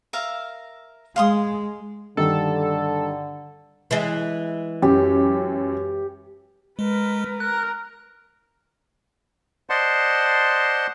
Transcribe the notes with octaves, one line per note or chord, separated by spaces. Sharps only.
A#4 E5 F5
G#3 F5 C6 D#6
G2 D3 D#3 A4
E3 G#3
F#2 G4
G#3 A#4 B4
A#4 F#6
C5 D5 D#5 F#5 A5 C6